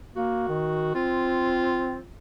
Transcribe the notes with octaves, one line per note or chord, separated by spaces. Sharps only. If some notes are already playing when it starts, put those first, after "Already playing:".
A#3 F#4
D#3
C4 F4